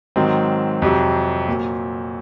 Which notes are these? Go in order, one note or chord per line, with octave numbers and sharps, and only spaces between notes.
G#2 D#3 F#3 C4
F2 C3 F#3
A#2 F#3